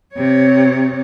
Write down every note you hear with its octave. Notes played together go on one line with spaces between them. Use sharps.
C3 C#5